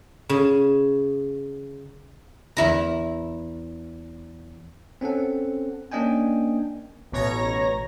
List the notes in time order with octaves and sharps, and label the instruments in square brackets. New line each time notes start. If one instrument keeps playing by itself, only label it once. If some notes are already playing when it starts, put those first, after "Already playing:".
[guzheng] C#3
E2 E4 A#5
[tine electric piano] C4 C#4 A4 F#5
A#3 C#4 D4 D#5 G5 G#5
[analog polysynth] A1 B2 C#5 A#5 A#6